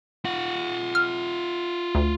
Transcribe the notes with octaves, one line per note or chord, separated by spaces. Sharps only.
F4 F#5
F6
D2